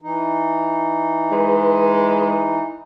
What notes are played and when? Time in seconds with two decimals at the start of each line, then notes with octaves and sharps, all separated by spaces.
0.02 E3 D#4
1.32 G#3 B4